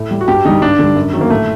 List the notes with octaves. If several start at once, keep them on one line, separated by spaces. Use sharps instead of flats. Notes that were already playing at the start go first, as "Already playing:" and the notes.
Already playing: A2
G3
F#4
G2 G4
D3 G3 D#4
G2 D4
D3 G3
F#2
D#3 F#3
A#3
A2 A3